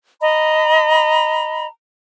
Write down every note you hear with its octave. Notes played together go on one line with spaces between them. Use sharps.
D#5 A#5 B5